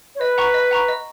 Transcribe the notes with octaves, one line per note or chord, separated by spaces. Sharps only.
C#5
B4 D#5
F#5 A#5 C#6
D#5
F#5 A#5 C#6
D#5